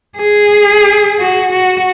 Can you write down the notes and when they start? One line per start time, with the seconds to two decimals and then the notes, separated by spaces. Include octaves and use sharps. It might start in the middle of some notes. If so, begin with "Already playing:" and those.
0.18 G#4
1.19 F#4
1.53 F#4